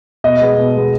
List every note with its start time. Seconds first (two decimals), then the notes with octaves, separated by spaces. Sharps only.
0.24 B2 D#5
0.41 G#3 B3
0.57 B2
0.74 G#3 B3